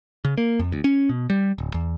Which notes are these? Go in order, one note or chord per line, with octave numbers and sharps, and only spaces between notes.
C#3
A#3
F2
D2
C#4
B2
G3
D1
E2